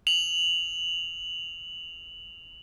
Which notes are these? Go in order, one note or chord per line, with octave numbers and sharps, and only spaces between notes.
F7 F#7